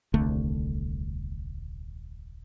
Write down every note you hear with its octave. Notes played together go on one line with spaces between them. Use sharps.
D#1 C2 D3 A3